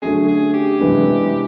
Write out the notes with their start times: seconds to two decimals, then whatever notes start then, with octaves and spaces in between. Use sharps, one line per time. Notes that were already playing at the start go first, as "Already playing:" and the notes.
0.02 D3 F#3 A3 C#4 G#4
0.28 G#4
0.54 G4
0.79 C3 E3 G#3 B3 D4